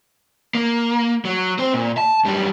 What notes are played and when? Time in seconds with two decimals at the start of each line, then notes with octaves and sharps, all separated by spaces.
0.55 A#3
1.25 F#3
1.59 C4 C5
1.74 A#2
1.98 A5
2.25 F#2 G3